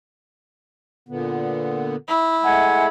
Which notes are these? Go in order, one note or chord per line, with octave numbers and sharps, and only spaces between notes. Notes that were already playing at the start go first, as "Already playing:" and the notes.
A#2 D3 B3
E4
G#3 A3 F#5 G#5 G#6